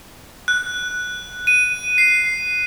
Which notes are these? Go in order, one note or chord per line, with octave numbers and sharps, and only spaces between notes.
F#6
D#7
C7